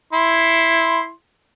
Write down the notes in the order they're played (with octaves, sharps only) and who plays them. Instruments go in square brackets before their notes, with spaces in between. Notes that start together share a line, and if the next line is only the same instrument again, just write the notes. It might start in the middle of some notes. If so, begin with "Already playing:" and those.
[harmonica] E4 C6